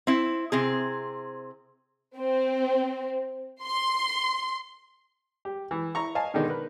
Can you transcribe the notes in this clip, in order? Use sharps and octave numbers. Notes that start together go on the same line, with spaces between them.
C4 E4
C3 C4 G#4
C4
C6
G4
E3
E4 A#5 C#6
D#5 F5 G#5 A5
B2 D3 D#3 G#3 D4 D#4
A#4 B4